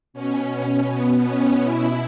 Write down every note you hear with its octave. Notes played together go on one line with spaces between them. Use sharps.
B2 C#4
B2 B3
C#4
B2 E4